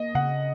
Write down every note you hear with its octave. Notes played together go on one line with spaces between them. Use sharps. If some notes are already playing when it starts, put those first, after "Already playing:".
Already playing: A#3 D#5
C#3 F#5